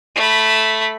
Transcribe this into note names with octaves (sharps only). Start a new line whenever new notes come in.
A3 B5